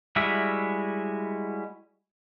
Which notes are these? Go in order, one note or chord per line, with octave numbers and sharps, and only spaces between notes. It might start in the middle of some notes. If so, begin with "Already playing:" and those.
G3 G#3 E4 F#4 E5